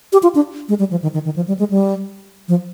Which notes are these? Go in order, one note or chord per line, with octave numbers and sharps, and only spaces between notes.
G4
F4
D4
G#3
G3
F3
D#3
D#3
D#3
F3
G3
G#3
G3
F3